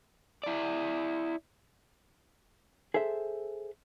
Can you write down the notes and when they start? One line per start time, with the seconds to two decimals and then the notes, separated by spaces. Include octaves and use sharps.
0.43 E4 D5
2.94 G#4 A4 C5 E5